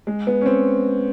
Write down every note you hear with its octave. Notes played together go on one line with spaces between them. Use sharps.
G#3
B3
C#4
C4